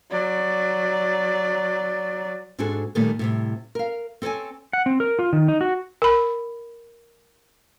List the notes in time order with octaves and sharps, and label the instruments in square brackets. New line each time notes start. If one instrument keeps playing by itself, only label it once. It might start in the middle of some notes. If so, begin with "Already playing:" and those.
[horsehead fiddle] F#3 D5
[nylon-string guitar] G#2 C4 D4 F#4 G#4 A4
A#2 D#3 G3 A3 A#3
A2 C3 G3
A#4 F5
C4 A4 C5 C#5 G#5
[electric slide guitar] F#5
C4
A#4
F4
D#3
D#4
F#4
[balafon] A#4 B5